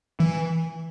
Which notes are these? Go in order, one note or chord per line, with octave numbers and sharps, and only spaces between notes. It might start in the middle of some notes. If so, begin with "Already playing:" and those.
E3